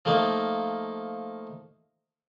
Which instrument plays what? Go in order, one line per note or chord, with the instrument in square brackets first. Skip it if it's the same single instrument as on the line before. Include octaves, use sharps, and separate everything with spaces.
[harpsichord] F3 A3 A#3 D#4